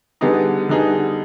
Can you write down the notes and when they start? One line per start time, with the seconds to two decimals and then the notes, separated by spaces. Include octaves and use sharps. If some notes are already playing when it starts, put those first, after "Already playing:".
0.21 D3 G3 B3 D#4 G#4
0.69 D3 G3 B3 D#4 G#4